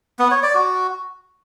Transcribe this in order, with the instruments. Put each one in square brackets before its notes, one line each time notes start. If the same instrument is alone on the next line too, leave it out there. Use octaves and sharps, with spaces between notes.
[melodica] B3
C#5
D5
F#4